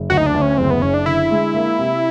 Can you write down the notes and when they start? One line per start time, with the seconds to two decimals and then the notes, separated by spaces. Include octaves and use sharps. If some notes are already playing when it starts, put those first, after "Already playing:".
Already playing: F#1
0.10 D2 F#4
0.17 D#4
0.26 D4
0.34 D2
0.42 C#4
0.58 F#1 C4
0.70 B3
0.82 F#1 C#4
0.94 D4
1.06 D3 E4
1.30 G#3
1.54 A#3
1.79 C3